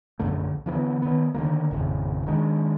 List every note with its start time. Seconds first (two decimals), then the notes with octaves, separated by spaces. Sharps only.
0.19 A#1 F#2 D3 A3
0.66 D3 E3 A3 B3
1.02 D#3 B3
1.34 D3 D#3 F3 A#3
1.71 G#1 F2 A2 C#3
2.26 D#3 G#3 D4